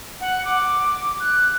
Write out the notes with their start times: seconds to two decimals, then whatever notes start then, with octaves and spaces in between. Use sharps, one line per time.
0.21 F#5
0.45 D6
1.20 F#6